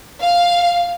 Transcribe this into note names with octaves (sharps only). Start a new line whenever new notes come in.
F5